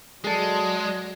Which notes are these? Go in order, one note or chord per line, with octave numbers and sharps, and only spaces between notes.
F#3 G#3 G#4 A4 D5